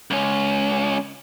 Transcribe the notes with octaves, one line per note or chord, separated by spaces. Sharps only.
C#2 C#4